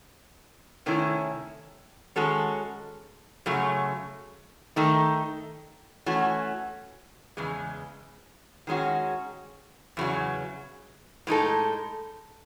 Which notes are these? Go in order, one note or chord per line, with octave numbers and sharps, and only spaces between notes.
C3 D#3 A3 C#4 E4
D#3 G#3 C#4 F#4 A4
F#2 C#3 F#3 A3
D#3 A3 D#4
E3 A3 C#4 F#4
E2 C#3 G#3
D#3 G#3 C#4 F#4
E2 C#3 F#3
A2 G#3 D#4 A4